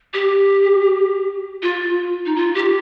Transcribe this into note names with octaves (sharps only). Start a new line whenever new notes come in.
G4
F4
D#4
F4
G4